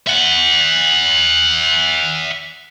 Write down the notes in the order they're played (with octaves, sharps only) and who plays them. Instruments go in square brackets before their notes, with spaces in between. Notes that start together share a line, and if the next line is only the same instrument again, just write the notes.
[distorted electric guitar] E5 F#5